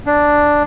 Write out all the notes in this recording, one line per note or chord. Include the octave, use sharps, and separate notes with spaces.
D4